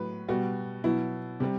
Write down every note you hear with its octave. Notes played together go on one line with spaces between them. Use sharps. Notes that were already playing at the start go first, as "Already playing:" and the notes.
Already playing: A2 F#3 B4
B2 G3 F#4
B2 F#3 E4
C3 G3